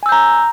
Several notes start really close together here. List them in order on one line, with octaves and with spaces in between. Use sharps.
G#5 E6 G6 A#5